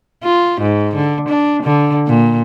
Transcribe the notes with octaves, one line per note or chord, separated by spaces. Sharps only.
F4
G#2
D3
D4
D3
A#2